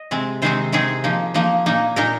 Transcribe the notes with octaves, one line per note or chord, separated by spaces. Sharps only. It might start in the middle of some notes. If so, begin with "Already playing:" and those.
Already playing: D#5
C3 G#3 C4
C3 D#3 G#3 C4 D#4 C5
C3 D#3 G#3 C4 D#4 G#4
F3 A#3 D#4
F3 A#3 D#4
A#2 A#3 D#4
A#2 A#3 D#4 A#4